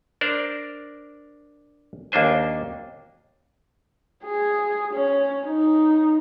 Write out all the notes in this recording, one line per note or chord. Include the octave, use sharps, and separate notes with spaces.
D4 A#4 C5 D5
D#2 A#3 D4 C5 G#5
G#4
C#4
D#4